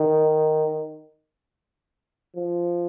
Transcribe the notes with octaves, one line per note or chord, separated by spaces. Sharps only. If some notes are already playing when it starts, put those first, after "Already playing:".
Already playing: D#3
F3